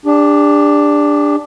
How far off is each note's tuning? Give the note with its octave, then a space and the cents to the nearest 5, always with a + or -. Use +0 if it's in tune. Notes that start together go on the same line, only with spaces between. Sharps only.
D4 +0 G4 +45